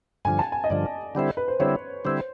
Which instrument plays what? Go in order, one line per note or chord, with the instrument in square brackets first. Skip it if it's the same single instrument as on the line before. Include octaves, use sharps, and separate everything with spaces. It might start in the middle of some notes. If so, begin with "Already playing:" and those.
[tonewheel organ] G2 D3 F3 [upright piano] G#5
[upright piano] A5
G#5
D#5
[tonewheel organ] G2 D3 F3 [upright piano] D5
[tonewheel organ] D3 G3 C4 E4
[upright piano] B4
C5
[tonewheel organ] D3 G3 C4 E4 [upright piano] C#5
[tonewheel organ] D3 G3 C4 E4 [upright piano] C5